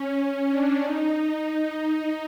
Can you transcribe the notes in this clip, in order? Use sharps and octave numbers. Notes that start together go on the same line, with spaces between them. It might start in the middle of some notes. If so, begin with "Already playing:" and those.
Already playing: C#4
D4
D#4